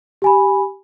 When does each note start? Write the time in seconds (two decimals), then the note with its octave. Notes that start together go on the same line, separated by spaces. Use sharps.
0.22 G4 G#5 B5